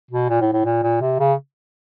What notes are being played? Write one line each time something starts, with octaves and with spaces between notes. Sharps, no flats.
B2
A#2
A2
A2
A#2
A#2
C3
C#3